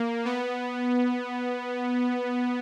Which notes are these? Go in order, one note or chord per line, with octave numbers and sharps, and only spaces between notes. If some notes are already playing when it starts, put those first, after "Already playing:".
Already playing: A#3
B3